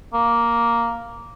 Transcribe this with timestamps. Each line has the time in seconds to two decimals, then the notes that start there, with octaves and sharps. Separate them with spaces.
0.13 A#3